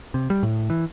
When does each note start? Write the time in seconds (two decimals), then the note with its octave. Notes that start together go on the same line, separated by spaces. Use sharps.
0.14 C3
0.30 G3
0.43 A2
0.70 E3